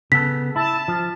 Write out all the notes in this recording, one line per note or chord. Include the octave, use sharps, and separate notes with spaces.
C#3 B3 A4 B6
E4 A5
F3